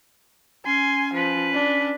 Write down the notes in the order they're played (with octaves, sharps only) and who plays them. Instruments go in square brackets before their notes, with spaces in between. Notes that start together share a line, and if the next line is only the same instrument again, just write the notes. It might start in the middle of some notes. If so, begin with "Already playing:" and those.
[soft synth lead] C#4 [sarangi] G#5 [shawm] C6
[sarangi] F3 [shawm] B4
[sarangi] D4